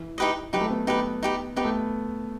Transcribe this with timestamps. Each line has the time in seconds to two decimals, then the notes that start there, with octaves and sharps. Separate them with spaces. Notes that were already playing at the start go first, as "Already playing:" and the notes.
Already playing: E3
0.18 D#4 G4 B4 D#5
0.53 F#3 D#4 G4 B4
0.61 A3
0.70 B3
0.87 B3 D#4 G4 B4
1.23 D#4 G4 B4
1.56 B3 D#4 G4 B4
1.65 A3